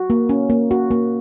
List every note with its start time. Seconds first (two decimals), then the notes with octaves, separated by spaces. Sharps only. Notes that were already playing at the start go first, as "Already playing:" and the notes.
Already playing: F#4
0.10 A#3
0.29 C#4
0.50 A#3
0.71 F#4
0.91 A#3